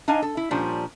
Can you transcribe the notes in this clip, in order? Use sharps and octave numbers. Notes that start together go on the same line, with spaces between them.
D4 D#4 D#5 F5 G#5
A4
E4
A#2 F3 G3 C#4 D4